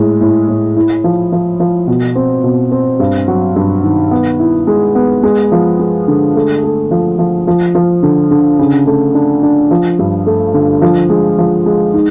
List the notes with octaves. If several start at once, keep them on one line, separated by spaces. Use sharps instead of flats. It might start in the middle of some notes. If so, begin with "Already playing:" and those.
Already playing: A2 G#3
A2
A2
E4
F3
F3
F3
B2
C4
B2
C4
G2
F#3
G2
D#3
B3
E4
G#3
B3
G#3
F3
G#3
D3
A3
A3
F3
F3
F3
F3
D3
D3
C#3
A3
D4
D4
F3
G2
A3
D3
F3
G#3
F3
G#3
D#4